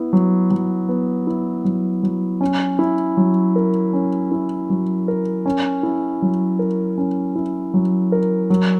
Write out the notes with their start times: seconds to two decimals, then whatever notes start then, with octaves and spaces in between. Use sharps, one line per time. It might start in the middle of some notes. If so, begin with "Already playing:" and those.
Already playing: B3 E4
0.13 F#3
0.51 F#3
0.89 B3
1.27 E4
1.65 F#3
2.03 F#3
2.41 C#4
2.79 E4
3.17 F#3
3.56 A#4
3.93 C#4
4.31 E4
4.70 F#3
5.08 A#4
5.46 C#4
5.83 E4
6.22 F#3
6.59 A#4
6.98 C#4
7.36 E4
7.74 F#3
8.12 A#4
8.50 F#3